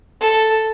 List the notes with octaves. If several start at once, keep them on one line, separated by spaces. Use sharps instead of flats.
A4